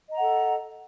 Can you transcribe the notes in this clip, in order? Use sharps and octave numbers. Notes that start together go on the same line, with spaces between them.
A4 D#5 F#5 A#5